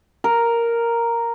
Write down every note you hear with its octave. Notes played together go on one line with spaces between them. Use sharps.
A#4